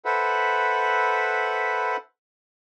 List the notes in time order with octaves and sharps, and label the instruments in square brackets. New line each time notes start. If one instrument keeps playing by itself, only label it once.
[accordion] A4 B4 C5 E5 F#5 B5